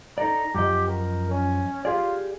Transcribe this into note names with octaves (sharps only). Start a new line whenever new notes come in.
D#4 A4 D5 A#5
F#2 F3 G4 D#5
A#4
C#4
F4 G4 G#4 D5